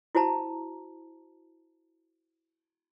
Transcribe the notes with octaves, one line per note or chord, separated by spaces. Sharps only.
E4 F#4 C5 A5 A#5